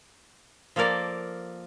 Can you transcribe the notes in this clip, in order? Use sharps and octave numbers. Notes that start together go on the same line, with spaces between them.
F3 A#3 A4 A#4 D5